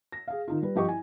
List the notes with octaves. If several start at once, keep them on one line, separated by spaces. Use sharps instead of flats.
A#6
G#4 F5
D#3 D#4 F4
G3 B4
G2 F3 G4 D#5 C#6
E4 G#5